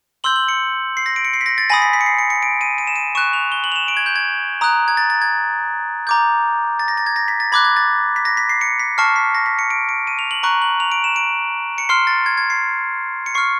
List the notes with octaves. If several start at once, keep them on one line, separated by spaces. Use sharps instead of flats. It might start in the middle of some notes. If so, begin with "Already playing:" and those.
C6 E6 G6 F#7
F#7
C#7
C7
A#6
D7
C#7
C7
B6
A#6
A6
G#5 B5 D#6 A#6
B6
B6
C#7
C7
C#7
C#7
D7
D#7
D#7
E7
D#7
C#6 F#6 E7
F7
G7
F#7
F7
E7
D7
G#6
G6
G#6
A#5 D#6 F#6
G#6
A6
A6
G#6
A#5 D6 G6
A6
A#6
A6
G#6
A#6
B6
A6
B5 D6 F#6 G#6
G#6
A6
B6
A#6
B6
C7
C#7
B6
A5 C#6 F6 C7
B6
A#6
B6
C#7
D7
D7
D#7
F7
F#7
A#5 C#6 F#6
F#7
F7
D7
E7
D7
C#7
C6 F6 C7
A6
G#6
G#6
C7
C#7
C#6 F6 C7